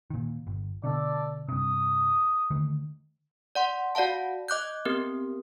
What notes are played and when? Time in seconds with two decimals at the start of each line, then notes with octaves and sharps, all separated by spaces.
0.10 A#2 D#3
0.47 G1
0.84 B2 D3 A4 D5
1.48 G2 C3 D#6
2.50 D3 D#3 A3
3.55 D5 F#5 C6
3.95 F#4 D5 F5 F#5 A5
4.48 D#5 D6 F#6 G6
4.85 B3 C4 G4 A#4